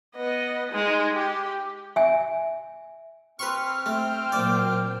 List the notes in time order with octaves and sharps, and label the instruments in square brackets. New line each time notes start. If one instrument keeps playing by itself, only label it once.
[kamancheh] B3 D#5
G#3 D#4
G4
[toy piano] E5 G#5
[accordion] C4 F6 [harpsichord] B4 C6 C#6
[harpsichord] A3 [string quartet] C5 G5
[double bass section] A#2 F#3 A#3 [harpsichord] D5